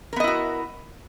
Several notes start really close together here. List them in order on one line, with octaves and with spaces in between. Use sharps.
A#4 B3 D#5 E4 F#4